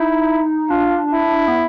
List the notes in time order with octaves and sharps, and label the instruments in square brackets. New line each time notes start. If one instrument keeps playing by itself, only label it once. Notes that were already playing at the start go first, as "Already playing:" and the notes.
Already playing: [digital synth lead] D#4 [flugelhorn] E4
[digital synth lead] D4 [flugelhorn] F4
[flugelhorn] E4
[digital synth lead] B3